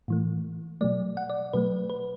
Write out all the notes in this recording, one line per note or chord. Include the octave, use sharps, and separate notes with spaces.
A2 E3 A3
B2 F#3 A3 D5
F#5
D5
B2 F#3 A3 B4
B4